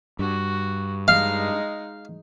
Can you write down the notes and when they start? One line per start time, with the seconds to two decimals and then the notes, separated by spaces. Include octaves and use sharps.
0.19 G2 F#4
1.08 G#3 D#4 F5